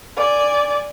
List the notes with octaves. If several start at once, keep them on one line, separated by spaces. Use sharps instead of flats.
D5 G#5